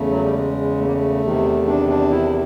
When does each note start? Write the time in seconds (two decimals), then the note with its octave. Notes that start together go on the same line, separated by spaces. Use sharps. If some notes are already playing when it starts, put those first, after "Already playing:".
Already playing: E2 C#3 A3
0.10 F#3
0.23 G3
0.34 G#3
0.78 A3
0.86 A#3
0.93 A3
1.23 E2 C3 D#3
1.67 D4
1.89 D4
2.11 E4